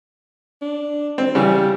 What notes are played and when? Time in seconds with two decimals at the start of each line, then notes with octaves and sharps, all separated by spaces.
0.62 D4
1.18 C4
1.35 C#3 E3 G3